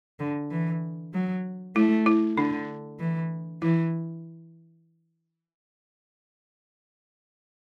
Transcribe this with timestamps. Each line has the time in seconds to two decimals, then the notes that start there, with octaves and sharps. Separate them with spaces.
0.20 D3
0.51 E3
1.13 F#3
1.76 A3 E4
2.06 E4
2.37 D3 D4
2.99 E3
3.62 E3 E4